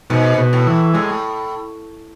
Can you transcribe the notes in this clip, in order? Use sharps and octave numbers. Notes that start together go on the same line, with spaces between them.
G#2 B2
B2
A2
E3
A2 G#3